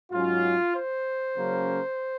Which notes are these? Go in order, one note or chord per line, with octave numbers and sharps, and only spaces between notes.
G#2 F#3 C#4 F4
C5
C#3 F#3 A#3 C#4